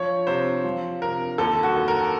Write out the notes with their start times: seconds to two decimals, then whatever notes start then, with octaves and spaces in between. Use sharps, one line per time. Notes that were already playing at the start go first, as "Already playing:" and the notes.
Already playing: F3 C#5
0.27 C3 C5
0.64 F3
1.01 C3 A#4
1.38 D#2 A4
1.63 F#4
1.76 D#2
1.88 A#4